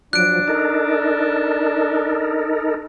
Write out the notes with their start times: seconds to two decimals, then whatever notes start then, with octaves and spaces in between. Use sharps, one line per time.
0.13 F3 F#3 D4 F#6 D7
0.48 D#4 A4 A#4